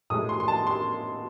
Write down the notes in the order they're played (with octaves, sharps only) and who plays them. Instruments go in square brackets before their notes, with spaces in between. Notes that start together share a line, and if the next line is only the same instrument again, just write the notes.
[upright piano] A2 G#3 D#6
C6
C6
A5
C6